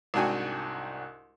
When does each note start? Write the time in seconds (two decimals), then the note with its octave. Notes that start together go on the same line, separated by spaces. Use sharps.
0.14 C2 G#2 D4 F#4 G5 G#5